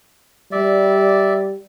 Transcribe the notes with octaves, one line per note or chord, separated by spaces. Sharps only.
G3 D5 E5